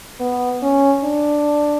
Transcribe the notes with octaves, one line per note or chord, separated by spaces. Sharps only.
B3
C#4
D4